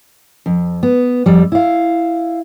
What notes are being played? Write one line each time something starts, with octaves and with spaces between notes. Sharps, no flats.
F2
B3
F2 G3
E4 F5